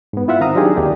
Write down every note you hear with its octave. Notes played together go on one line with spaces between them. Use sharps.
G#2 B3
E4 F4 E5 F#5
D#3 C4 F5 A#5 D#6
F#3 D4 D#4 F4 G4 G#4
D#2 D#3 G4 D5